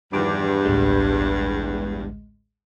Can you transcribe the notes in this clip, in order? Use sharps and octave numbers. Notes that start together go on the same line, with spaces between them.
E2 G2 D#3 F3 D6
A1 D2 G#3